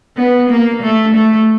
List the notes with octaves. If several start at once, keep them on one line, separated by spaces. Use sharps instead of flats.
B3
A#3
A3
A3